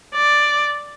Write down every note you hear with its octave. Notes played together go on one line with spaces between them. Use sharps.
D5